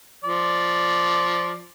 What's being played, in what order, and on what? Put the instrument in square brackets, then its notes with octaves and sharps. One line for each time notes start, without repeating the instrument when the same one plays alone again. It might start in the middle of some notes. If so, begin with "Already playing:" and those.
[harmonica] F3 D5